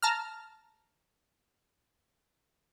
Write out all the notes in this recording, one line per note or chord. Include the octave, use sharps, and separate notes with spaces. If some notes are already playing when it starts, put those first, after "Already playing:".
A5 A#5 F6